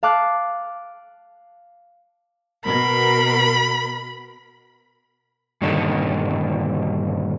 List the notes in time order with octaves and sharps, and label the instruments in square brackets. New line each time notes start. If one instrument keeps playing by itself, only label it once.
[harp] F5 A5 D6 F#6
[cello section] B2 A#4 [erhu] B5
[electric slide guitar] G2 A#2 D3 D#3